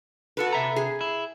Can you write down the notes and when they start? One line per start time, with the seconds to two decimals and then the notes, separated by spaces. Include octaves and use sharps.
0.37 F#4 A4 B4
0.53 C3 E5 A#5
0.76 G#4
1.01 E4